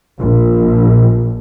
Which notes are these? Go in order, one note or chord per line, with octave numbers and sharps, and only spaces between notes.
A#1